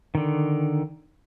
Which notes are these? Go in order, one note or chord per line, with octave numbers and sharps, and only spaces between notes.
D3 D#3